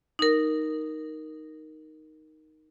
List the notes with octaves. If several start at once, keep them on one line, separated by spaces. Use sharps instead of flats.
D#4 A#4